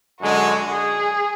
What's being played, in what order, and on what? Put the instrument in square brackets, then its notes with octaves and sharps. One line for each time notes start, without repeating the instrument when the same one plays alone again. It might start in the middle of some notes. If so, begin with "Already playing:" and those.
[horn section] F#2 D3 G#3 [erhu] F#4
[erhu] G#4